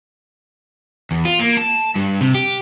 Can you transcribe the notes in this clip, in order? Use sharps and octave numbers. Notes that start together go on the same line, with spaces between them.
E2
F4
A#3
A5
G2
C3
G4